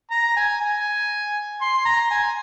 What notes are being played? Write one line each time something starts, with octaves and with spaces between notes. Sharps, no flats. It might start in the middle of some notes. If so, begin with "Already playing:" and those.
A#5
G#5
G#5
C6
A#5
G#5